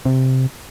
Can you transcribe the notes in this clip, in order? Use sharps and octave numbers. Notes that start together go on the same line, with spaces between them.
C3